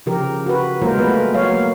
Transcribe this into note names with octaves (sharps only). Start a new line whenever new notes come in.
C#3 F3 G4 A#4
F#4 B4
F#3 G#3 A#3 F4 A#4 C5
A3 B3 A#4 B4
F#3 A#3 C#5 F5